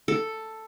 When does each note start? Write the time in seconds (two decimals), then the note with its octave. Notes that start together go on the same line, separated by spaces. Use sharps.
0.08 A4